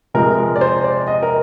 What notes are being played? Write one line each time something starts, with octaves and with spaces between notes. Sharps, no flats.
C3 F3 G#3 A#4
A#4
D5
C5
D5
D#5
A#4